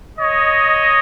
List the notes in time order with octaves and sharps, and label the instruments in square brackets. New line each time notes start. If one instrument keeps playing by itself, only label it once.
[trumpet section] C#5 D#5